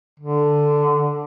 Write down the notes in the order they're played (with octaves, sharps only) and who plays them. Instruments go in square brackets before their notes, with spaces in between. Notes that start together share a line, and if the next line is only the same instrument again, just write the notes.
[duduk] D3